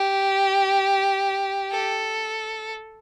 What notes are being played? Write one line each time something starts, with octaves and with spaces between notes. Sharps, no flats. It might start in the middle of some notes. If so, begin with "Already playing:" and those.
Already playing: G4
A4